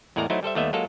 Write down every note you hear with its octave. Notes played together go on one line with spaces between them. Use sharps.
E2 A2 G#3 A#4 D5 A#5
F#3 A3 D#4 E4 C5
G3 A4 C5 E5
D#2 G3 A3 B3 D#5 E5
F#3 G#3 A#3 F4 A4